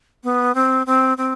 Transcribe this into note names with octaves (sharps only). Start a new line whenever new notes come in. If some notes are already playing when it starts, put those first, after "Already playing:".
B3
C4
C4
C4